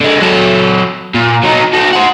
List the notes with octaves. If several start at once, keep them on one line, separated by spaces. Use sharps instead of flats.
D3 G#3
F#3 A4
A#2
F#3 D#4
F#4 A4
C5 F#5